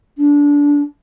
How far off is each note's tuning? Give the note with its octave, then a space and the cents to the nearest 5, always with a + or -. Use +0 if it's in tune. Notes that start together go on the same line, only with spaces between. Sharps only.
D4 -20